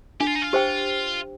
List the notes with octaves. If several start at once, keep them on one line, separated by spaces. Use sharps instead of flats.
D4 G4
F4
D#4
F4
G4 C5 G5